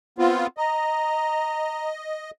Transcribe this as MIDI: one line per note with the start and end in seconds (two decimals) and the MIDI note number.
0.19 0.47 59
0.19 0.47 60
0.19 0.47 65
0.57 2.31 75
0.57 1.87 82